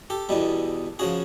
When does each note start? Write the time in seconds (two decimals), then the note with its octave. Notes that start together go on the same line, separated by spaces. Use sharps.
0.10 G4 A4
0.29 E2 B2 G3
0.99 C#3 F3 F#4 G#4